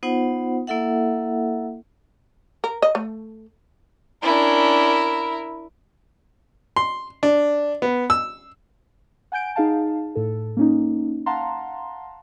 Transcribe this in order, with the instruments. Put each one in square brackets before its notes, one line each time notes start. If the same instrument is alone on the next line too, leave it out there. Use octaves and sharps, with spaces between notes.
[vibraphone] B3 D#4 F4 C5 F#5
A#3 E4 A4 E5 F#5
[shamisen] A#4
D#5
A3
[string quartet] C#4 D4 [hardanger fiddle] E4 A#4
[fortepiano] C6
D4
B3
E6
[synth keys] F#5 G#5 G6 D7
D#4 G#4 F5 A5
A2 A4
A#3 C#4 D#4
F5 F#5 A5 A#5 C6